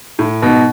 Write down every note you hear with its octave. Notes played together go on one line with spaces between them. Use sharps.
A2
G#2 B2